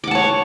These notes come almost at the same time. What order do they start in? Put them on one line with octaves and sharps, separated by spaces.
D6 F#5 A5 C#5